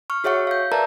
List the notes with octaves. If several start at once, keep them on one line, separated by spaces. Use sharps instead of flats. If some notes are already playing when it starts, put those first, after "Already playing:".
C#6 F6
F#4 G#4 C#5 E5 F#5 C#6
F5 G6
A#4 B4 D5 E5 A5 A#5